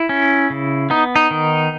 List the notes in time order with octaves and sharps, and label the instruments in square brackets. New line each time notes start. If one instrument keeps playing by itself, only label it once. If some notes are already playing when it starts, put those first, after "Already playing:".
Already playing: [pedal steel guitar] E4
C#4
C#3
B3 D#4
D#4
D#3